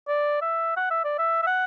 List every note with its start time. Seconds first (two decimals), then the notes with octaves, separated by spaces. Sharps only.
0.08 D5
0.42 E5
0.77 F#5
0.91 E5
1.04 D5
1.18 E5
1.42 E5
1.47 F#5